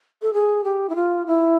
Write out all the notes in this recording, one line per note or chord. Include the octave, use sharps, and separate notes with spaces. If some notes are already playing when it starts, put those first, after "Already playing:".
A4
G#4
G4
E4
F4
E4